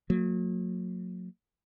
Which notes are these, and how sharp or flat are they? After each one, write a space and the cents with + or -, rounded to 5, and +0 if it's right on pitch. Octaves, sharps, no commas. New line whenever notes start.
F#3 -35 A#3 -45